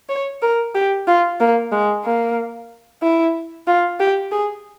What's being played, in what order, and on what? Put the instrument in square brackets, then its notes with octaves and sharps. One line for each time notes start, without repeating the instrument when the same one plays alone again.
[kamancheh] C#5
A#4
G4
F4
A#3
G#3
A#3
E4
F4
G4
G#4